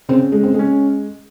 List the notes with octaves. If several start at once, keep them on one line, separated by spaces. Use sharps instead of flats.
C#3 C4
G#3
C4
G#3 C#4